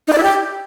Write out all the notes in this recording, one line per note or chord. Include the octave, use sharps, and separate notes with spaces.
D#4
D5
E4
G4